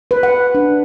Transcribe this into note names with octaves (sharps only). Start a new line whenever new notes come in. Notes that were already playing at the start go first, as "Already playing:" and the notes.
B4
F#5
D4